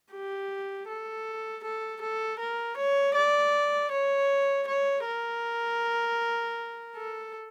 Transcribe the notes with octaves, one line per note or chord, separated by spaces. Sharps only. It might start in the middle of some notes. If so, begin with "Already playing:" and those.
G4
A4
A4
A4
A#4
C#5
D5
C#5
C#5
A#4
A4